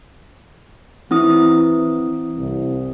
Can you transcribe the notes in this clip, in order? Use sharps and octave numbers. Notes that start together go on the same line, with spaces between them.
E3 C4 E4 D#6
C2